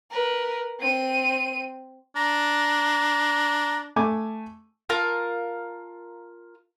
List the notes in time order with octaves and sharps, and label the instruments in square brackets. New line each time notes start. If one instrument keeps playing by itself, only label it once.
[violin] A#4 B4
C4 D#7
[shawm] D4 [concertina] A#5
[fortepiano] A3 G#5 D6
[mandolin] F4 A#4 F5 A5